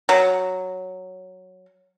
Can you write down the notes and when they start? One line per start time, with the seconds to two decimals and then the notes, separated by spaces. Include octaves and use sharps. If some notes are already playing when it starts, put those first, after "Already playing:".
0.09 F#3